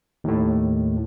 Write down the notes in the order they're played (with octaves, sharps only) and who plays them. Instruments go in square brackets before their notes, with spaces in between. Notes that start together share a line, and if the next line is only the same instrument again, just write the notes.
[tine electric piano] D#2 A2